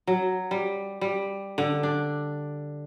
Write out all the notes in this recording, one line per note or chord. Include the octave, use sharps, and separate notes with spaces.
F#3
G3
G3
D3
D4